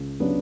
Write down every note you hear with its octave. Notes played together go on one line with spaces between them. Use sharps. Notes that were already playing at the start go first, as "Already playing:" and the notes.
Already playing: C#2
C#3 F#3 B3 D4